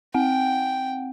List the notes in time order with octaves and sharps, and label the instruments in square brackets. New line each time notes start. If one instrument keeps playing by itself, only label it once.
[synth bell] C4 F#5 [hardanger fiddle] G5